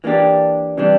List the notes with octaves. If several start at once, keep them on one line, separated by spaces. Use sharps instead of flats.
E3 A#3 D4 G4
C3 E3 G3 D4